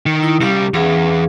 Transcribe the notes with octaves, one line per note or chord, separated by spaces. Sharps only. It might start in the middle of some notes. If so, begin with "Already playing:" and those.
D#3
E4 D#6
C2 G3 C#4 G4 F5
E2 C#4 G#4 F5